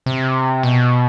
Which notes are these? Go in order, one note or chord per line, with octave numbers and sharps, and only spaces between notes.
C3
B2